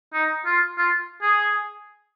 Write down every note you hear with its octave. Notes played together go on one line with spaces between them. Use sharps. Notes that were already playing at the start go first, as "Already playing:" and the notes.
D#4
F4
F4
G#4